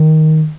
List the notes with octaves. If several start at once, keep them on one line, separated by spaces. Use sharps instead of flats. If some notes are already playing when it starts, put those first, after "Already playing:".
Already playing: D#3